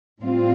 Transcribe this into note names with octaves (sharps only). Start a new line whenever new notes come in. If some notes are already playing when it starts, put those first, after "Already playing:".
A2 G3 C4 F4